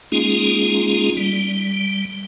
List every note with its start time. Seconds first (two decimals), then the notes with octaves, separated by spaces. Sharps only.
0.12 G#3 A#3 C#4 D#4 F4 G#4
1.17 G3